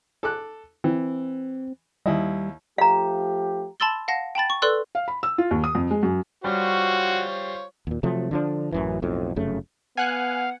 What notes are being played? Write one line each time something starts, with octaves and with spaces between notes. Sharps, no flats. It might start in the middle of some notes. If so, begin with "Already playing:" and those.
A4 D6 F#6
E3 C4
D#2 G3 E4 D#5
F3 A3 G4 F5 A#5
A5 B5 C6 E6 A6 G7
F5 F#5 A5 A#6
G5 A5 B5 A6
C#6
A4 B4 D5 C6 E6 F#6
F5
B5
E6
F4
D#2
D#6
F2
G#3
F#2
G3 F4 F#4 C5 C#5
D#2 A#2
C3 F3 F#3 A3
D3 F3 D4
A1 F#2 E3
B1 F2 A2
F1 F#2 C#3 A3
B3 F5 F#5 G#5 F#6